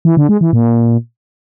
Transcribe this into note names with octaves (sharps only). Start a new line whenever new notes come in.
E3
D3
G#3
E3
A#2